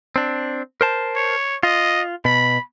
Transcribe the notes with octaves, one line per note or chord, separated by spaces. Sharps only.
C4 D4
A#4 C5 A5
C#5
F4 D#5
B2 B5